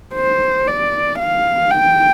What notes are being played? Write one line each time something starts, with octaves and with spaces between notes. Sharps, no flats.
C5
D5
F5
G5